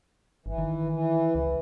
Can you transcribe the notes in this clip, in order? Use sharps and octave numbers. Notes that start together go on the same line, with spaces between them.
G1 E3
D#3
E3
C#2